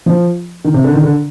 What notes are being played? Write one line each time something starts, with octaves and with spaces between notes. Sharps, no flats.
F3
D#3
C3
D3
D#3
D3